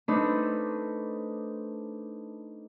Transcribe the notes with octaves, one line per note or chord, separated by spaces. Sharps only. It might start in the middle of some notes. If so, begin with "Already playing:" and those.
A3 C4 D4 D#4 B4